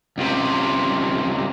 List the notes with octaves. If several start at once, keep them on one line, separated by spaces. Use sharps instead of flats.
C#2 C3